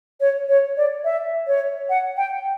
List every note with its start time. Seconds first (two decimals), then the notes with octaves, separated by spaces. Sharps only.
0.21 C#5
0.49 C#5
0.77 D5
1.05 E5
1.47 C#5
1.90 F#5
2.17 G5